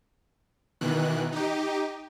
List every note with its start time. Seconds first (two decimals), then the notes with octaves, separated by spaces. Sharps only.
0.81 B2 D#3 E3 F#6
1.32 D#4 G4